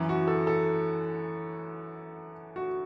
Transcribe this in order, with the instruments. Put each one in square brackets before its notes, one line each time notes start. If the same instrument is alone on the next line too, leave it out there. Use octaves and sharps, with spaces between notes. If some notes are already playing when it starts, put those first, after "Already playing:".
Already playing: [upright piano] F#2 E3
F#4
A4
A4
F#4